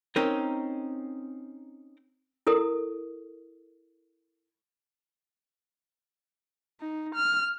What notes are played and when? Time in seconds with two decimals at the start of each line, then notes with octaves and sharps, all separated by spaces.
0.16 C4 C#4 D#4 A#4
2.47 E4 A4 A#4 D#6
6.81 D#4
7.15 F6